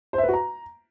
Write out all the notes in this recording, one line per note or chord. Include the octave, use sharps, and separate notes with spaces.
C5
E5
B4
F#4
A#5